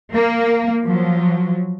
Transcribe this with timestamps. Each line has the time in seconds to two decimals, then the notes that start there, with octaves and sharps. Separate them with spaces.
0.14 A#3
0.85 F3 F#3